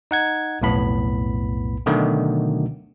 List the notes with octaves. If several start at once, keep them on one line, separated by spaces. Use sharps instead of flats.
D#4 F#5 G#6
B1 F2 A2 B3 B5
B2 D3 D#3 F#3 A3